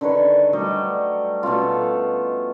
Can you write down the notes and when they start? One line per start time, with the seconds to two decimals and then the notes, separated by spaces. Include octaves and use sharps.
0.01 D3 D#3 B4 C#5
0.53 F#3 G3 A3 D#5
1.43 B2 A3 C#4 F4